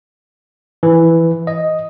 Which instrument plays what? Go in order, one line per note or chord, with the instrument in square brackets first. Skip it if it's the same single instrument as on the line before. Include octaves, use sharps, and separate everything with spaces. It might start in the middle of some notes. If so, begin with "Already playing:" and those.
[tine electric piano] E3
D#5